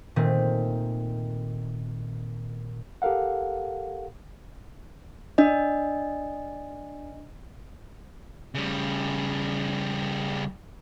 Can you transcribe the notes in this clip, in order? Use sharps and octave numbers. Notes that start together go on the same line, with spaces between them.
A#2 D#3 A3 C4
G4 A4 A#4 F5 F#5
D4 D#5
C#3 G3